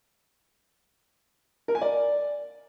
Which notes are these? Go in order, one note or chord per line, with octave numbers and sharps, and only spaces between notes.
A#4
G#5
D5